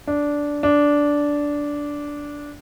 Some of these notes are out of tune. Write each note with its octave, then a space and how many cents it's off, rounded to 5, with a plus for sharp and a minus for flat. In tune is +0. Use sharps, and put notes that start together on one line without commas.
D4 -10
D4 -10